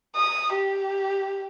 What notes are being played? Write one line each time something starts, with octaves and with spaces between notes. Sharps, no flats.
D#6
G4